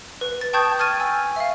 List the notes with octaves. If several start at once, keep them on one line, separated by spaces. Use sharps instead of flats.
B4
A6
G5 A5 C#6 D#6 G6 G#6
C#6 F6 G#6 A6 D#7
G#5 E6
E5 F5